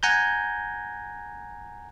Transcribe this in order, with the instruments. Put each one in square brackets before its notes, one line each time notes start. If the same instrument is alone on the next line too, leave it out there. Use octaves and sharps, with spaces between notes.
[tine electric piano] F#5 G#5 A#5 G6